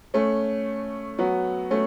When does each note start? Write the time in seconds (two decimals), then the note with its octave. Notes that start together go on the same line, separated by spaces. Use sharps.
0.14 A3 C#4
1.19 F#3 B3
1.71 A3 C#4